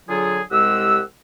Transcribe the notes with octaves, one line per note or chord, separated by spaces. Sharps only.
D3 F#3 F4 G#4
C2 G#3 G4 F#5 E6